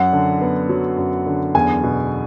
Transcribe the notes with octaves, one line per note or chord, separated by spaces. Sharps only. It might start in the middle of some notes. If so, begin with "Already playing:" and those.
Already playing: F#2 F#5
D3
B3
F#3
F#2
D3
E2 G#5
B2